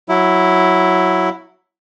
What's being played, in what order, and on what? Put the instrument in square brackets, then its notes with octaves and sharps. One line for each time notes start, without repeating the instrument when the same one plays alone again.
[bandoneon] F#3 E4